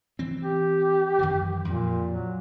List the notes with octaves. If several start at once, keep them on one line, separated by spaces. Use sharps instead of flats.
E3 C4
G4
F#2 D#3 E3
F2 A#2
F#3